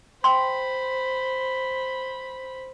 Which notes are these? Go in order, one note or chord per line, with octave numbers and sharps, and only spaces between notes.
C5 G5 B5 C6